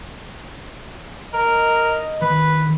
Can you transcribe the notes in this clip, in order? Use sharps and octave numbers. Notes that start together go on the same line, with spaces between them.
A#4 D#5
D#3 B4